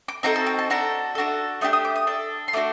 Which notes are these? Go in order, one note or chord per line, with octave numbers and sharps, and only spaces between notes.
D6
C4 D#4 F#4 A4 A#5
A5
G5
A5
D4 F#4 A4 A#5
D4 F#4 A4
A3 D4 G4 D#6
D#6
D6
D#6
D4 A4
C6
A3 D4 F#4 D6